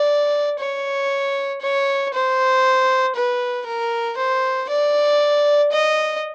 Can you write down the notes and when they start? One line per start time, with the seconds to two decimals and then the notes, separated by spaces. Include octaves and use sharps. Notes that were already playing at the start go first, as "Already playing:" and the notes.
Already playing: D5
0.59 C#5
1.61 C#5
2.13 C5
3.15 B4
3.66 A#4
4.17 C5
4.69 D5
5.72 D#5